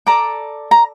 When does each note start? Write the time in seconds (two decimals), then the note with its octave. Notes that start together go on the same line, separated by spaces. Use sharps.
0.07 A4 D5 A#5 D6
0.71 A#5